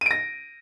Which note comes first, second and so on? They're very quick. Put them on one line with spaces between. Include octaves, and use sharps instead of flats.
D#7 D7 A#6